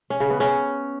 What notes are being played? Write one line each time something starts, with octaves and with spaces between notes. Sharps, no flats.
C#4
C#3
B3
C#4